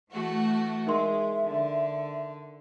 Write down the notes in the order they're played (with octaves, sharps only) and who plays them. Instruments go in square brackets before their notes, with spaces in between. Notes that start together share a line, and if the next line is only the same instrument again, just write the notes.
[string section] E3 A3 F#4
[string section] G#3 [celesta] D#4 A#4 C6 [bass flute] E5
[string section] D3